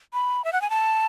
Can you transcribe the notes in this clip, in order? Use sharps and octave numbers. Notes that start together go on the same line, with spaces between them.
B5
E5
F#5
G#5
A5